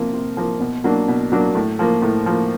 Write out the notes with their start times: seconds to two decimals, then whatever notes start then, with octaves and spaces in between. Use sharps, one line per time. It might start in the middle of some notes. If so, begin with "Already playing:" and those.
Already playing: C3 F3 A#3
0.13 C3
0.37 F3 A#3
0.60 B2
0.84 F#3 A#3 D4
1.08 B2
1.32 F#3 A#3 D4
1.55 A2
1.79 F3 A#3
2.02 A2
2.26 F3 A#3